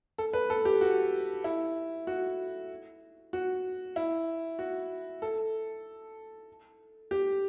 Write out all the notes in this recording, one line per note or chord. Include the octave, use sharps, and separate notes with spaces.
A4
B4
A4
G4
F#4
E4
F#4
F#4
E4
F#4
A4
G4